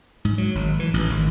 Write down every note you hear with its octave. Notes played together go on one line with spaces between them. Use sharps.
G#2
F#3
G#1
E3
A1
G#1